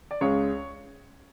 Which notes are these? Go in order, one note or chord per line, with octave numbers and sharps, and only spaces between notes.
D5
C#2 C#3 G#3 C#5